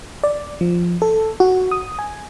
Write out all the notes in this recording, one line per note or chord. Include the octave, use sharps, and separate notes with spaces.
D5
F3
A4
F#4
D#6
G#5